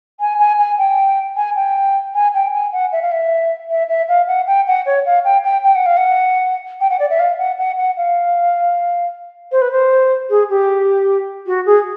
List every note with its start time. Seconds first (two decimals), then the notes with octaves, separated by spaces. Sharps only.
0.20 G#5
0.39 G#5
0.59 G#5
0.78 G5
1.36 G#5
1.56 G5
2.14 G#5
2.34 G5
2.53 G#5
2.72 F#5
2.92 E5
3.02 F5
3.11 E5
3.70 E5
3.89 E5
4.09 F5
4.28 F#5
4.47 G5
4.67 F#5
4.86 C#5
5.06 F5
5.24 G5
5.44 G5
5.64 G5
5.75 F#5
5.86 F5
5.97 F#5
6.81 G5
6.90 F#5
7.00 D5
7.10 E5
7.19 F5
7.38 F#5
7.58 F#5
7.78 F#5
7.97 F5
9.52 C5
9.62 B4
9.72 C5
10.30 G#4
10.49 G4
11.47 F#4
11.66 G#4